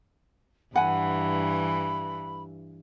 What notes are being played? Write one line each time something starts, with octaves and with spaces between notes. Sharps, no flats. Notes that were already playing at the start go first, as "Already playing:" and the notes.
G2 E3 F#5 G#5 B5